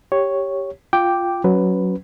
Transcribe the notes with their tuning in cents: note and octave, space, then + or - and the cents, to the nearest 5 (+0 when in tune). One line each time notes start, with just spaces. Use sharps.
G4 +0 C#5 +0
F4 +0 G5 +0 D6 +0
F#3 +0 C#4 +0 B4 +5